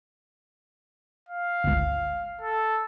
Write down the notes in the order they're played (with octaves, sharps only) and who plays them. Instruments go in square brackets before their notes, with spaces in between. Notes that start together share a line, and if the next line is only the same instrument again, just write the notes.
[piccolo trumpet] F5
[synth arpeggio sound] G1 C#2
[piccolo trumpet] A4